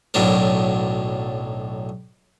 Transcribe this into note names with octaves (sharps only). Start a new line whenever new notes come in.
B1 F#2 A2 B3 D4 A#4